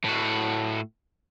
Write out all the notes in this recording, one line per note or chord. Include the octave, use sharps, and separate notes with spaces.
A2 F#4